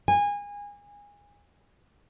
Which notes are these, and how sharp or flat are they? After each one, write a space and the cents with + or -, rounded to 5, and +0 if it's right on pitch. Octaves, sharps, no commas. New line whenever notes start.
G#5 -25